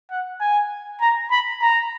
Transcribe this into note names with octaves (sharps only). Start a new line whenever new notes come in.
F#5
G#5
A#5
B5
A#5